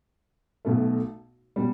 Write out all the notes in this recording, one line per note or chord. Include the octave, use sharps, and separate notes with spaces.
B1 B2 A3
B2 G3